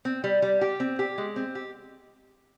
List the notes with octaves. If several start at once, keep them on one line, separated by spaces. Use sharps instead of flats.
C4
G3
G3
G4
C4
G4
G#3
C4
G4